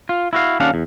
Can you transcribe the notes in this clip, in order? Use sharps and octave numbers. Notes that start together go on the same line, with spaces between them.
F4
E4 F#4 F5
D#2 C#4 D4 F5 F#5
E2